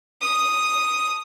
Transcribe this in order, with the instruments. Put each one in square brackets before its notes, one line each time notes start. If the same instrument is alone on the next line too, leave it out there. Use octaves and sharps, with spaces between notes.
[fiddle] D#6